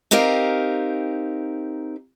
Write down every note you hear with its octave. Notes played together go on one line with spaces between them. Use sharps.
C4 D#4 G4 A#4 F5